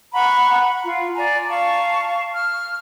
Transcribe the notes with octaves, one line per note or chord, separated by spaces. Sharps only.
F#5 A#5 B5 C#6
F4
D5 G#5 A#5
F5 A5 C#6
F6